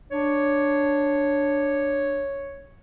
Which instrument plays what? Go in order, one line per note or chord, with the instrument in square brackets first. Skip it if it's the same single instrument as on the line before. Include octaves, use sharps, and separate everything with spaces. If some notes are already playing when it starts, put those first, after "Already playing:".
[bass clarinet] D4 [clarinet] C#5